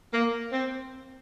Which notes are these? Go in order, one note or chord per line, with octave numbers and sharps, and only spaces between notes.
A#3
C4